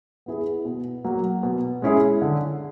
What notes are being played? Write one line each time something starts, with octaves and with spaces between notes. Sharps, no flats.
B3 E4 G#4
B2
F#3 A#3
B2
G#3 C#4 E4 G#4
D3